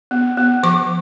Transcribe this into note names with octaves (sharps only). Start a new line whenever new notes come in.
B3
B3
F3 D6